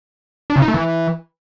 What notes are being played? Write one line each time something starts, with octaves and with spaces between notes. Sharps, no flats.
D4
C#3
D#4
A3
E3